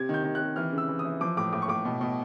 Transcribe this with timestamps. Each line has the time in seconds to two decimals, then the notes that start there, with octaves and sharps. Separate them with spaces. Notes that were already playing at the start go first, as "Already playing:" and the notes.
Already playing: C3 G#6
0.09 D#3 G6
0.24 D#3
0.35 F#6
0.41 C3
0.56 E3 F6
0.72 C#3
0.78 E6
0.89 E3
0.99 D#6
1.05 E3
1.21 F3 D6
1.37 A2 D6
1.53 A2 D6
1.62 C#6
1.68 A2 D6
1.85 B2
2.01 B2